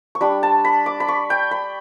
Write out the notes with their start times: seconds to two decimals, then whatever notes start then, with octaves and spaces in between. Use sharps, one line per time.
0.15 C#6
0.21 G3 D4 B5
0.43 A5
0.65 B5
0.86 D6
1.00 B5
1.08 C#6
1.30 G5
1.51 B5